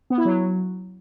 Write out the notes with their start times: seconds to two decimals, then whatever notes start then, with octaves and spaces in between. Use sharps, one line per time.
0.10 B3
0.18 E4
0.25 F#3